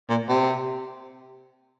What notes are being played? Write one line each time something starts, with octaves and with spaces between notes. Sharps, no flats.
A#2
C3